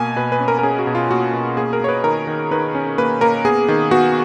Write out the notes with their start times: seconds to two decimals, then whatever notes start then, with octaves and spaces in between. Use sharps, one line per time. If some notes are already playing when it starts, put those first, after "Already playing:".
Already playing: B2 A#3 G#5
0.16 B2 B4
0.32 B4
0.40 C#4
0.48 A#4
0.59 A#4
0.63 C#4 G#4
0.79 F#4
0.87 B2
0.95 F4
1.10 A#3 F#4
1.33 B2
1.57 A#3 G#4
1.73 A#4
1.81 A#3 C#5
1.89 B4
2.04 D#3 A#4
2.27 D#3
2.51 D#3 B4
2.75 C#4
2.98 A#3 B4
3.21 A#3 A#4
3.45 B3 G#4
3.68 D#3
3.91 B3 F#4